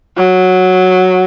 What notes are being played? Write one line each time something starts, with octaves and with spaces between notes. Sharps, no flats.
F#3